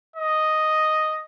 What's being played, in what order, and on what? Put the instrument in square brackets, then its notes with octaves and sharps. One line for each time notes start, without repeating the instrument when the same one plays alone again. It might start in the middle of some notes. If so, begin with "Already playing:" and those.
[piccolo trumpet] D#5